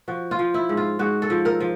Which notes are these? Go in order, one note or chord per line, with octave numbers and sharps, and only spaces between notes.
F3 F#4
F4
F3
E4
G#2
F4
G#2 F#4
A4
F3
A#4
F3